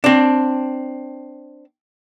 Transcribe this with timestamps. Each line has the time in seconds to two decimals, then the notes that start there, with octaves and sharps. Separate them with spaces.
0.04 C4 D4